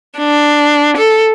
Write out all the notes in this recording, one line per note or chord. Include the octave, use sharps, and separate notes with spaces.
D4
A4